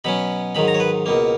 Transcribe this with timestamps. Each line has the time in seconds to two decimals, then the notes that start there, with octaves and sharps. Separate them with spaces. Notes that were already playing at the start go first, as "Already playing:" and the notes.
0.04 B2 F#3 C#4 B5
0.55 G#2 D#3 F#3 B5
0.68 A#5
0.75 C#5
0.80 B4
1.06 C#2 B2 A#3